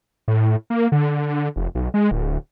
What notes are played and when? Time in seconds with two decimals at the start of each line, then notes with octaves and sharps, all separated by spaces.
0.28 A2
0.70 A#3
0.92 D3
1.56 F1
1.75 B1
1.94 G#3
2.11 D1